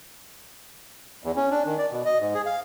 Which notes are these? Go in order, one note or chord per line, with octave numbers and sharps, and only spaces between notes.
E2
C#4
D4
D#3
D5
B2
D#5
G#2
G#4
F5